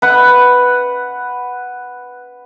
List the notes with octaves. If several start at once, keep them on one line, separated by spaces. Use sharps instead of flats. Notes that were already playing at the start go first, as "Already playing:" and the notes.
B4 F#5